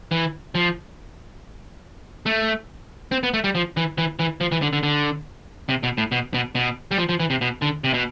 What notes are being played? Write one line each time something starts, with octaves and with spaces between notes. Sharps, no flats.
E3
F3
A3
C4
B3
A3
G3
F3
E3
E3
E3
F3
E3
D3
D3
D3
C3
B2
A2
B2
B2
B2
G3
F3
F3
E3
C3
B2
D3
C3
B2